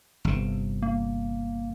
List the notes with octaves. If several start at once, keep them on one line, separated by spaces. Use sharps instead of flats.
G1 C3
A#3